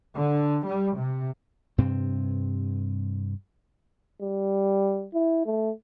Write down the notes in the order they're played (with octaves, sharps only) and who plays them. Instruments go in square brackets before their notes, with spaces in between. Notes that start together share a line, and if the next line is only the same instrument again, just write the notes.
[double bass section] D3
G3
C3
[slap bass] G2 C3 C4
[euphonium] G3
E4
A3